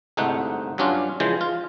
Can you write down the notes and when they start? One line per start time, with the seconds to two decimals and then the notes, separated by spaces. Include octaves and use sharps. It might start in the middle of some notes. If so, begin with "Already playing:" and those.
0.17 G1 C2 G#2 A3 D#4 F#5
0.78 G2 F#3 C#4 D4 F4
1.20 C#3 E3 F3 G#3 C5
1.41 F4